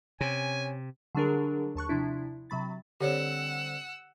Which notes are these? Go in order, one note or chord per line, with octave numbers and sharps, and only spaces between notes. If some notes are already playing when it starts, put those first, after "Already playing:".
C3 C#4 G#5
D3 F#3 G3 D4 G#4 A#4
D#2 A5 C#6 F#6
C3 F3 D4 E4
C3 F#3 B5 A6
D3 G3 C4 G4 C#5 F#5 E6